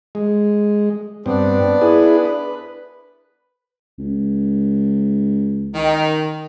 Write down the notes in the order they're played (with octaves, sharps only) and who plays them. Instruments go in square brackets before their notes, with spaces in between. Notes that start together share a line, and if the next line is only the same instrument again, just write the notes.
[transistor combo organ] G#3
[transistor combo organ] G2 C4 [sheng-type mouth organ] B3 D4
[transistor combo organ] E4 G#4 B4
B4
[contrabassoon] C#2
[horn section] D#3